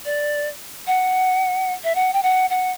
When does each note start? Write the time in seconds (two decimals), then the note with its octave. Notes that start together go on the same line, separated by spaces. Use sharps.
0.05 D5
0.87 F#5
1.84 E5
1.95 F#5
2.13 G5
2.23 F#5
2.50 F#5